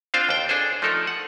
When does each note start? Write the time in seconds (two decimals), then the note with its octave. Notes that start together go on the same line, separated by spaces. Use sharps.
0.14 C4 D4 F4 C5 F5 G5
0.29 D#2 G5
0.49 D4 G#4 A4 C5
0.82 F3 A3 D#4 A4 A#4
1.07 F#5